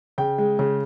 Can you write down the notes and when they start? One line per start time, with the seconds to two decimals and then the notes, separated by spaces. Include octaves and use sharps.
0.18 C#3 G5
0.38 G#3
0.59 C#3